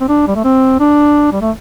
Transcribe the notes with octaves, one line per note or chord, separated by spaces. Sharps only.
C4
D4
G3
A3
C4
D4
G3
A3